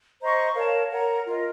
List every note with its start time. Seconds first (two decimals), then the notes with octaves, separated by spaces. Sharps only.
0.20 C5 D#5 A#5 C#6
0.56 A#4 C#5 F5 A5
0.91 A#4 C#5 F#5 A#5
1.26 F4 A#4 D#5